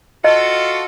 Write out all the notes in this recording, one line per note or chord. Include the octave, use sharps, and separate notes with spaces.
F4 F#4 A4 D#5